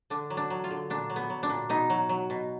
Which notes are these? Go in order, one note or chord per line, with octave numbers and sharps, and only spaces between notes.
D3 D4
F#3
D4
F#3
F4
D3
A#2 D4
F#3
B3
F#3
D4
A#2
B2 D#4
F#3
F#3
B2